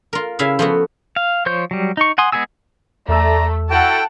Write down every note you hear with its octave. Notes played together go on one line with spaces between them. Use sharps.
F4 A#4
C#3 E4 E5 F5
F3 A3 B3 E4 F#4
F5
F3 C5 C#5 G6
F#3 G3
D#4 C#6
F#5 G#5 C6 D#6
G#3 B3 G#4 G#5 E6
E2 A3 A4 D5 A#5 E6
E4 F#4 A4 F#5 G5 A5